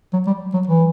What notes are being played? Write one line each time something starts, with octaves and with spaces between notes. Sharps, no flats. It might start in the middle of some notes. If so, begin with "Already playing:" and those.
F#3
G3
F#3
E3